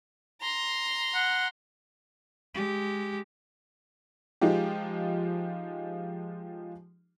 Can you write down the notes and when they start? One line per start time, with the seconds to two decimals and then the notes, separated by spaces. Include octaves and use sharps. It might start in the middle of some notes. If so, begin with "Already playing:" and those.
0.41 A#5 C6
1.15 F#5
2.54 G#3 G4
4.41 F3 G#3 D#4 F4 G4